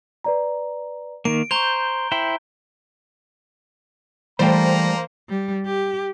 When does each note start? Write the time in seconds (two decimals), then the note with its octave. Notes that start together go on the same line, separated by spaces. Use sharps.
0.24 B4 D5 A#5
1.25 D#3 A#3 D7
1.51 C5 A#5 C#6 G6 F7 G7
2.12 E4 C5 G5
4.39 E3 G3 A3 A#3 C5 G5 A#5
5.29 G3
5.66 G4